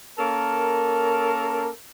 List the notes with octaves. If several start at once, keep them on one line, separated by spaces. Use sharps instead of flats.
A#3 C#4 A4 A#4